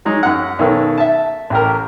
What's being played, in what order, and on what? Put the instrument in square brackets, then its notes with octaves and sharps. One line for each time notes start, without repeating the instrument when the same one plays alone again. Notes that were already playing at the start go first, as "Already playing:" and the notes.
[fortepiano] F#3 G#3 D#4
F#2 F#5
B1 D#3 C#4 A4 B4
E5 A5
A1 G4 A#4